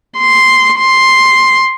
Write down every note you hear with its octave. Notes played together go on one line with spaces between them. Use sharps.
C6
C6